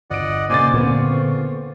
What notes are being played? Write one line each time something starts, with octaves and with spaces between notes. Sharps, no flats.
G1 D5 D#5 F#5 D7
A#2 C#3 C5 D5 G#5 D6 A6
A#2 D3 B3 C4 F4 C#6